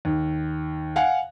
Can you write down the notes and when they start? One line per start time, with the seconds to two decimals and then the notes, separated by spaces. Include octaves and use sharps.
0.05 D#2
0.96 F5 F#5 G#5